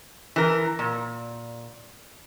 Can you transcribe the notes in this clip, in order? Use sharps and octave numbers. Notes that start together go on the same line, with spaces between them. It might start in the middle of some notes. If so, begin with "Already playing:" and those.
E3 A#4
A#2